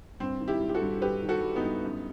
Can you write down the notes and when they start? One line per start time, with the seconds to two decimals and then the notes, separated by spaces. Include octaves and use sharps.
0.20 G2 C4
0.40 D#3
0.48 E4 G4
0.61 G3
0.69 G4
0.74 F#4 A4
0.81 G2
1.02 G2 G4 B4
1.22 D#3
1.29 F#4 A4
1.43 G3
1.56 B3 D#4
1.63 G2
1.83 F#2